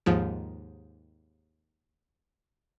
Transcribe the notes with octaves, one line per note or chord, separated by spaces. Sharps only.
D#2 G#2 F3